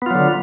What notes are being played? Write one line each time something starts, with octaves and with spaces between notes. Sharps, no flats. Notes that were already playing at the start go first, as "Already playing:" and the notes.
D3 F#3 B3 F4